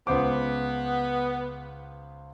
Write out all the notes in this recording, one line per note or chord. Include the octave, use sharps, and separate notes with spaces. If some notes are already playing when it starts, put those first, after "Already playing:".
C#2 B3 C5 D6